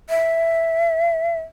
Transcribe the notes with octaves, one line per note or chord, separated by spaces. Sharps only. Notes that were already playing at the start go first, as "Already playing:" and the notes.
E5